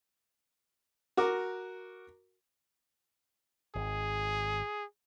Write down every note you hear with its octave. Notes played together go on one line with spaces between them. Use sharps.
F#4 A#4 D6
G#1 G#4